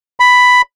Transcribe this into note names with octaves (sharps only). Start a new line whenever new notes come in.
B5